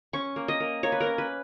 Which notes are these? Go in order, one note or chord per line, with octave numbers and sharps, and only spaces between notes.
C#4 C#6
A#3
D#5
A#3
A#3 C#5
B4
A#4
C#4
B4